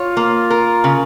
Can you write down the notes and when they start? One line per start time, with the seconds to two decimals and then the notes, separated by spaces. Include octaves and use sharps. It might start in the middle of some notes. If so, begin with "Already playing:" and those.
Already playing: F4 C#5
0.17 A#3
0.50 A#4
0.84 C#3